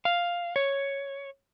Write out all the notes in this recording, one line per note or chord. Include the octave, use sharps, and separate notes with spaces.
F5
C#5